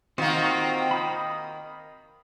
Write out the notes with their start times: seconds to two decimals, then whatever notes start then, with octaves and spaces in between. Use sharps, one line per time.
0.18 D#3 A#3 C4 F4 F#4
0.91 B5 D#6 G6